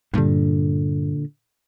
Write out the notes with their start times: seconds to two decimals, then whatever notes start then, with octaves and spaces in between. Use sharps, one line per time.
0.14 G2 A#2 D3